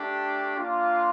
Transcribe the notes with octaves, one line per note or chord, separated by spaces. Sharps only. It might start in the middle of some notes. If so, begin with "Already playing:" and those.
Already playing: A3 D4 G4
A#3 D4 F4